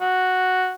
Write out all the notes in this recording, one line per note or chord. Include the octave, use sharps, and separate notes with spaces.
F#4